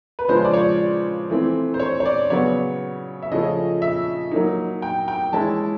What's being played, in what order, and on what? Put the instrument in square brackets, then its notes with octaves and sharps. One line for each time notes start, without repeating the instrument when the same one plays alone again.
[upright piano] B4
C#3 F3 G#3 C#4 F4 C5
D5
C#5
E3 A3 C4
C5
C#5
C#5
D5
C#3 F#3 B3 C#5
E5
C#3 F3 A3 C#4 D#5
E5
F#3 A#3 D#4
G5
G5
E3 G#3 C#4 E4 A5